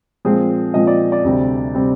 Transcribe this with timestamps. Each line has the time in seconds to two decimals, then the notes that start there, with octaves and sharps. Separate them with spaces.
0.25 A#2 F3 G#3 C4 G#4
0.74 A#2 F3 G#3 C4 D#5
0.87 D5
1.12 D5
1.24 D2 C3 G3 C4
1.75 C3 G3 C4